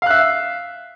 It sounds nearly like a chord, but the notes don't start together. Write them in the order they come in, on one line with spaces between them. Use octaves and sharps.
F5 F#6 E5